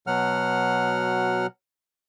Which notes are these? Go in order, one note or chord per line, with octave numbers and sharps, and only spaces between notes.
B2 F#3 F#5 F6